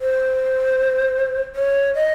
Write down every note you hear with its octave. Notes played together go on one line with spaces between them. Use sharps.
C5
C#5
D#5